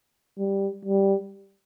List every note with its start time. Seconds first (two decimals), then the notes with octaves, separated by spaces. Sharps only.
0.39 G3
0.85 G3